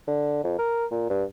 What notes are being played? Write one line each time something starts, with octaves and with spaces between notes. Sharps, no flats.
D3
F2
A#4
A#2
G2